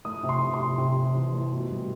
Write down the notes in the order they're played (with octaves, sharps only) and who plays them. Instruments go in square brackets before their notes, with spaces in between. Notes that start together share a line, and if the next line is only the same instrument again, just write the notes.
[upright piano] A3 D#6
C3
C6
C3
C6
C3
C3
C3
E3
A3
B2
G3